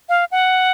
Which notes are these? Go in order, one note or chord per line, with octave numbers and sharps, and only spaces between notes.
F5
F#5